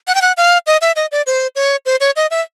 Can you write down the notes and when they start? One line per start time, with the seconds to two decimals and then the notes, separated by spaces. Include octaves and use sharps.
0.08 F#5
0.15 G5
0.22 F#5
0.37 F5
0.67 D#5
0.81 E5
0.96 D#5
1.12 D5
1.27 C5
1.56 C#5
1.86 C5
2.00 C#5
2.16 D#5
2.31 E5